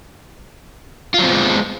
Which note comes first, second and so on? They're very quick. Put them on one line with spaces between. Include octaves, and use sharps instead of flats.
F4 F#3 C4 B3 G#3